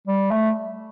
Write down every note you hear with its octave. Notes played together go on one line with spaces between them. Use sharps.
G3
A3